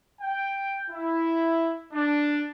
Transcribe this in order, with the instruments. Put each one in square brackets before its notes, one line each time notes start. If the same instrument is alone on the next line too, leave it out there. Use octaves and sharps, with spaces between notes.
[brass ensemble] G5
E4
D4